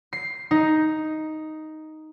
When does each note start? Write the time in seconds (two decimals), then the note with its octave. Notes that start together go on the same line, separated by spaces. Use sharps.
0.13 C7
0.51 D#4